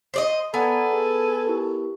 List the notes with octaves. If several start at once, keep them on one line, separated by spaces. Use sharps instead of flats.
C5 D5 D#5
B3 A4 B4 D5 F#5 G#5 A#5
G#4
E4 G4 A#4